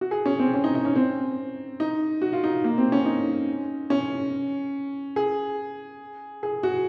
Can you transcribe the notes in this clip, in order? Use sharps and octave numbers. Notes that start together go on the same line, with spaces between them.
F#4
G#4
C#4
C4
C#4
D#4
D#4
C#4
C4
D#4
F#4
F4
D#4
A#3
C4
C#4
D#4
C#4
G#4
G#4
F#4